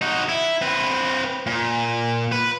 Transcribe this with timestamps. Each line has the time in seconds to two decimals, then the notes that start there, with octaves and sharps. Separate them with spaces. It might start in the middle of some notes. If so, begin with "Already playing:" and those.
0.01 D#4 F#4
0.29 E4
0.61 C4 B4
1.46 A#2
2.32 B4